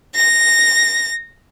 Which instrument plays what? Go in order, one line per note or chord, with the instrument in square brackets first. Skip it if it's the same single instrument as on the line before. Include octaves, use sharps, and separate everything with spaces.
[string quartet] A#6